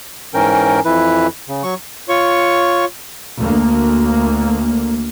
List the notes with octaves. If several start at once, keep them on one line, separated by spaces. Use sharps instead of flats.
G#2 E3 C#4 A#4 G5
F2 E3 E4 B4
C#3
F#3 C#6
F4 C#5 C#6
D2 A#3